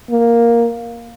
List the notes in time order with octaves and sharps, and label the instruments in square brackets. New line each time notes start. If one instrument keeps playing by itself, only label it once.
[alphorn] A#3